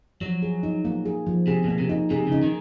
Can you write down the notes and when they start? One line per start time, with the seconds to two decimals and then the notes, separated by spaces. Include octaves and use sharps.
0.21 F3 F#3
0.42 G#4
0.63 D#4
0.85 A#3
1.06 G#4
1.27 F3
1.47 C3 G#4
1.64 B2 A#3
1.79 C3
1.89 D#4
2.10 C3 G#4
2.27 C#3 D#4
2.43 D#3